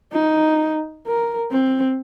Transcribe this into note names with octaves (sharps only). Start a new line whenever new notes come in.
D#4
A#4
C4